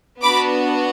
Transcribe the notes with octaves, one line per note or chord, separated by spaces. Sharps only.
B3 D4 F#4 B5 D6